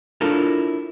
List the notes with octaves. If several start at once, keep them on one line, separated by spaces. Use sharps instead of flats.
D4 E4 F4 A4 A#4 C#5